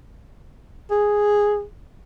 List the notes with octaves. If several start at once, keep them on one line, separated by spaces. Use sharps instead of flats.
G#4